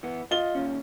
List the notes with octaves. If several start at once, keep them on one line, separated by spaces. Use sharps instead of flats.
E3 B3
F4 D#5 G7
D#2 C#4